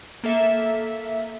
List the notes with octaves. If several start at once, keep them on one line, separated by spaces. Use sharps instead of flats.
A#3 A4 E5